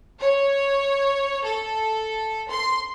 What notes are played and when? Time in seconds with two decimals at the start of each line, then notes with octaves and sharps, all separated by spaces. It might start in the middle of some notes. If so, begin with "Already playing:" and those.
0.20 C#5
1.43 A4
2.50 C6